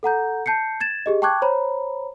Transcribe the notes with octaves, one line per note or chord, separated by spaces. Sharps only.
A4 F#5 A#5 G6
A5 G6 C7 C#7
G#6 A6 E7
G4 G#4 D#5
G5 A5 C#6 D6 F#6 G#6
C5 C#5 A#5 B5